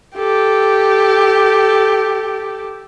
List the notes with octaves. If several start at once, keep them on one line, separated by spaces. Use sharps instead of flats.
G4 A4